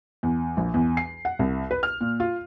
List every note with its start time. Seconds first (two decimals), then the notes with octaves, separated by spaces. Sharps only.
0.23 E2
0.57 A#1
0.74 E2
0.97 C7
1.25 F#5
1.39 C2
1.71 B4
1.83 F6
2.01 A#2
2.20 F4